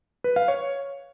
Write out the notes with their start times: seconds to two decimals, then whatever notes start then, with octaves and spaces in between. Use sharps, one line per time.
0.24 B4
0.36 F5
0.48 C#5